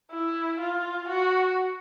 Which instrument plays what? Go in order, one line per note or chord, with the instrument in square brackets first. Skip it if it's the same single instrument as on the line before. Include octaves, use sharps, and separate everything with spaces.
[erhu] E4
F4
F#4